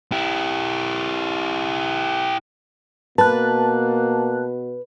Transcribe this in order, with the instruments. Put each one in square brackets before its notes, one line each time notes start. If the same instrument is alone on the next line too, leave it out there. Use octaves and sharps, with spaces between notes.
[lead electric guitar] E4 G4
[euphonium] B2 [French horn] A#3 [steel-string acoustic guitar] B4 [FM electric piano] A5 F#6